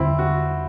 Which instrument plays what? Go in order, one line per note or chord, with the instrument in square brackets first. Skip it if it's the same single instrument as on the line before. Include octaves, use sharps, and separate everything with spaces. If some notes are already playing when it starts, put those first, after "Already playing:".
Already playing: [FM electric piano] E2 D3 G3 [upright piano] C4 E4
[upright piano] F#4